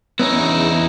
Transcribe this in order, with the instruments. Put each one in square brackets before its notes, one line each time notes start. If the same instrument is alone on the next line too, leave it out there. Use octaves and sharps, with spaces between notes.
[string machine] E2 [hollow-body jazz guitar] B3 C#4 [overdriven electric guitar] D#4 E4